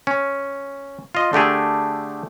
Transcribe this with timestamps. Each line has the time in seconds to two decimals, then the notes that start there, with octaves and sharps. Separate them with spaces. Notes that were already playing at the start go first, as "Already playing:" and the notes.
0.07 C#4
1.15 F4 D#5
1.33 D3 A3 G4 G#4